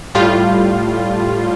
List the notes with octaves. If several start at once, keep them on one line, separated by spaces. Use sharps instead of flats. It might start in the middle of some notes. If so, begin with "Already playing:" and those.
A2 G3 F4